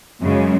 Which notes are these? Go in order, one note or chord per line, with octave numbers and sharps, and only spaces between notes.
F#2 C#3 G#3